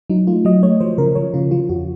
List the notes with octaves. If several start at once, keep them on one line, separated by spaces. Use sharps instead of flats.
F#3 D#4
A3 F4
F#3 D#5
A3 C#5
F3 C5
C#3 A#4
F3 C#5
C#3 F4
F3 F4
F2 F#4